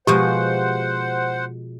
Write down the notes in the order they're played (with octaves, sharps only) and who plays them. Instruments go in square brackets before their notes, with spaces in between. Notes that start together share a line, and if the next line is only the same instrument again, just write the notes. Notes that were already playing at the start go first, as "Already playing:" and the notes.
[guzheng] B2 F3 G#3 [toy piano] G4 [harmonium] C5 F#5